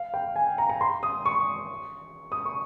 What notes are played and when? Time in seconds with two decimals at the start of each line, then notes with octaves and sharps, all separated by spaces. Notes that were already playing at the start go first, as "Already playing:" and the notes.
Already playing: F5
0.14 G5
0.36 G#5
0.58 A#5
0.70 A#5
0.81 C6
1.03 D#6
1.25 C#6
2.32 D#6
2.46 C#6